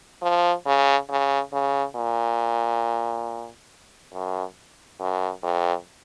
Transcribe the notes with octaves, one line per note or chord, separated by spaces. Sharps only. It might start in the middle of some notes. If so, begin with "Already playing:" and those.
F3
C#3
C#3
C#3
A#2
F#2
F#2
F2